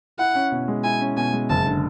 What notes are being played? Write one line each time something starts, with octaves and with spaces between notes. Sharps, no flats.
E4 F#5
C#4
B2
G#3
E4 G#5
C#4
B2 G#5
G#3
F#1 A5
D3